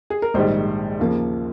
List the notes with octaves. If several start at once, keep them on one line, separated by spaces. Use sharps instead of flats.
G#4
A#4
A#1 G#2 D#3 G3 C5
D#2 C#3 F3 A#3